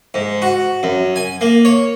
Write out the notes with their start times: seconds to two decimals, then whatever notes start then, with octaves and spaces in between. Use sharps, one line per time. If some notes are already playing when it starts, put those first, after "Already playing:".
0.14 G#2
0.42 F#4
0.83 F#2
1.16 G#5
1.41 A#3
1.65 C#5